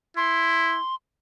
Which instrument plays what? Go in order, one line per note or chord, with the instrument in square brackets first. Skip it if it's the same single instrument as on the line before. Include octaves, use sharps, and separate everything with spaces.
[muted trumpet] E4 [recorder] C6